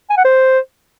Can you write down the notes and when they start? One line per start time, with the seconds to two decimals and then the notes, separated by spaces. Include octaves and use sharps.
0.10 G#5
0.17 F#5
0.25 C5